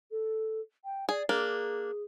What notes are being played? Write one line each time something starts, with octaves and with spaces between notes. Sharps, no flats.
A4
G5
G#4 D5
A#3 D4 G#4